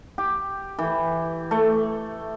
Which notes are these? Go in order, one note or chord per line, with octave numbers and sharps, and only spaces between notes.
G4
E3
A3